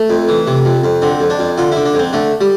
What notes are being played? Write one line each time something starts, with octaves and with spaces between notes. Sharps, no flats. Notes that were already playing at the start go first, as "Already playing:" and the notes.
Already playing: A3
F2
E3
C3
F2
F2
D3 C4
F2
D4
F2
D3 F4
D3 E4
D4
F2 C4
D3 A3
G3